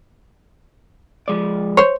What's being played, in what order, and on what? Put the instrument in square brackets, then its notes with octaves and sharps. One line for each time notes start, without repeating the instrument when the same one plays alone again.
[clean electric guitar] F3 G#3 D5
[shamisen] C5 C#5